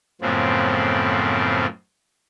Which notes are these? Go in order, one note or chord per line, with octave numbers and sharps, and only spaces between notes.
F#2 A2 C#3 F3 B3 C4